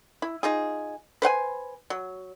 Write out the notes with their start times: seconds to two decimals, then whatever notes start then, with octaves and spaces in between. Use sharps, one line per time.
0.22 E4
0.43 D#4 F4 G#4
1.22 B4 C5 F#5 G#5
1.90 F#3